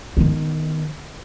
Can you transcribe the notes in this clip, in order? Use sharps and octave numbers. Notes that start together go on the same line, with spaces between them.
D#3 B3